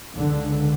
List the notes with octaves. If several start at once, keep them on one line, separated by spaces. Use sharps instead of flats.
C#2 D3